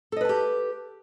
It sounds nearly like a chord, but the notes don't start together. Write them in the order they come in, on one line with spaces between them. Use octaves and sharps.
A4 D#5 B4 A5 G4